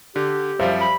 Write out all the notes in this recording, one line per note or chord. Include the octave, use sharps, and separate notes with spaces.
D3 G4
F#2 F3 G3 C5 E5 F5
B5